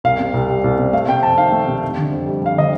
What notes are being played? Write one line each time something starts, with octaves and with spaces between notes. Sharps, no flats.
C2 F5
C3
C2
G3
C2
C3
A3 F5
C3 G5
F2 A5
D#3 F5
A3
C3
F2
D3
F2
G3
F2 F5
D3 D#5